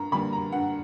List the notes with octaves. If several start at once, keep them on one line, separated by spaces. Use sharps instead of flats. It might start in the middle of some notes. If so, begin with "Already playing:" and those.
Already playing: G2 A#5
D3 G3 A#3 B5
A#5
G2 F#5